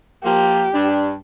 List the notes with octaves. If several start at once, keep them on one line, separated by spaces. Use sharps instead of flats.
F3 A#3 G4
G2 D4